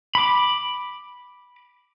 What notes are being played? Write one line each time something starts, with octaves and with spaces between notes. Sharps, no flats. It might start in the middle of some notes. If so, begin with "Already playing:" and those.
B5 D6